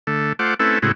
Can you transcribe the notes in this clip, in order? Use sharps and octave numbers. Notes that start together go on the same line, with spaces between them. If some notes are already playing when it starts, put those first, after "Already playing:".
D3 A3
A3 F4 C5 F#5 D6
A3 C4 C#4 E4 A4 B4
A2 C#3 G#3 C4 E4 F#4